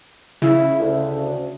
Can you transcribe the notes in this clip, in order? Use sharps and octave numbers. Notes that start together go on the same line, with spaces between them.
C#3 E4
D2